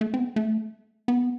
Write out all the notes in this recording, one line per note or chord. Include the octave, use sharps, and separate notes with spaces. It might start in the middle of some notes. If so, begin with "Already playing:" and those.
A3
C4
B3
A3
B3